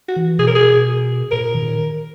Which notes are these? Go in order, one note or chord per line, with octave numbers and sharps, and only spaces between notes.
F#4
E3
B2 G#4
A#4
G#4
A#2 A#4
D#3